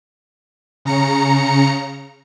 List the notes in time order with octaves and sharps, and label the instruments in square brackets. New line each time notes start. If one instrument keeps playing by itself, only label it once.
[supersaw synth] C#3 A#5 C#7